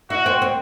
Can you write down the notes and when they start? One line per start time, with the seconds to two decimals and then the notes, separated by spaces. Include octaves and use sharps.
0.10 E4 F#4
0.26 C4
0.42 C4